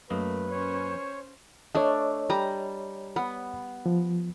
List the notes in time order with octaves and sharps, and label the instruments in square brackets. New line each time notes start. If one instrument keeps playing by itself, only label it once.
[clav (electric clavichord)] F#2 A#3 D#5 [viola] A3 [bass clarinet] B4
[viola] C#4 C5 [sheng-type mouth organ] C#5
[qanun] A3 D4 [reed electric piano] C#5 D#5
[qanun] G3 A#5
B3
[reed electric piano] F3